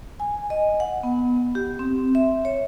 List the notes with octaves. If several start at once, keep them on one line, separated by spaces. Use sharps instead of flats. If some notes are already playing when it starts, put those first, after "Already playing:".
G#5
D#5
F#5
B3
G4
C4
E5
C#5